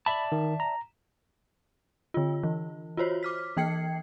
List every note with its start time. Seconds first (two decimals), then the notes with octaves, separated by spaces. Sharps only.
0.06 D5 E5 A5 B5
0.32 D#3
0.60 A#5
2.14 D3 F4
2.43 E3
2.97 F4 F#4 C5 C#5
3.23 D6 F6 B6
3.57 E3 A#3 G5 G#6 C7 C#7